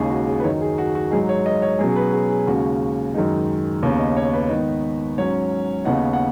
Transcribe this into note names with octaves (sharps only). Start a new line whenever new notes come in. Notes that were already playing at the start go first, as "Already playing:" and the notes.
Already playing: D#2 C#3 G#3 D#4 G#4
F#4
G#4
B4
F#2 D#3 F#3 D#4 C#5
G#4
F#4
F#4
G#2 F#3 D#4 G#4
C#5
D#5
C#5
B2 F#3 C#4 G#4
G#4
B4
G#4
G#4
D#2 C#3 G#3 C#4 F#4
F#2 D#3 G#3 D#4
D#2 C#3 B3 C#5
D#5
C#5
B4
G#2 D#3 B3 D#4
G#2 F#3 C#4 C#5
D#2 C#3 B3 D#4 F#5
F#5